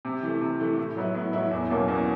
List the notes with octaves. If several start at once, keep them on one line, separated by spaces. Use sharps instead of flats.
C3
E3 A3
C3
E3 A3
A2
F#3 B3 E4
A2
F#3 B3 E4
E2
B2 F#3 A#3 C#4
E2